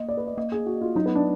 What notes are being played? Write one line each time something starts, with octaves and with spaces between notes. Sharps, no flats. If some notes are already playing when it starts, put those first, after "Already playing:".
Already playing: A#3 D#5
D5
B4
D5
A#3 D#5
G#4
F#4
F4
F#3 D#4
B3
D4